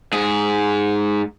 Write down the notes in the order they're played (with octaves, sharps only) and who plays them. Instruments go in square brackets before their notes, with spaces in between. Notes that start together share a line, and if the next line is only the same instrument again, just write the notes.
[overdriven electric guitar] G#2 G#4